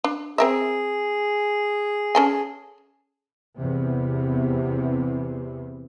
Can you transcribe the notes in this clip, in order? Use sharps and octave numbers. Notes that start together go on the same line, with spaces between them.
D4
C4 G#4 A#4 E5
C#4 A4 G#5
E2 C3